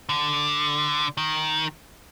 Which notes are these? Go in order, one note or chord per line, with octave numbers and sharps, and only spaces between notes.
D3
D#3